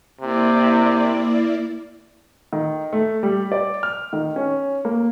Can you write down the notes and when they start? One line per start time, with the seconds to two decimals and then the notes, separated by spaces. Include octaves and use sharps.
0.20 C3 A#3 E4 D5
2.53 D#3
2.93 A3
3.23 G3
3.52 D5
3.83 F6
4.13 D#3
4.36 C#4
4.85 A#3